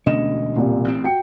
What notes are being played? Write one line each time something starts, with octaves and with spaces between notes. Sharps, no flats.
E1 D2 B2 C#4 D#5 E7
C2 A#2
A1 C4
F#4 G5 C#7